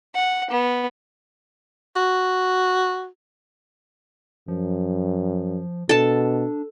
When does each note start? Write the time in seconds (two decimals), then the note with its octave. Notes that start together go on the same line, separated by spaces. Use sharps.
0.15 F#5
0.51 B3
1.96 F#4
4.48 F#2 F3
5.89 B2 D4 A4 A5